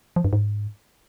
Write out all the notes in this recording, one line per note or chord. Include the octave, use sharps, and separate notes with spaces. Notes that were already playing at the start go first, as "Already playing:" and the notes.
F3
G2
G#2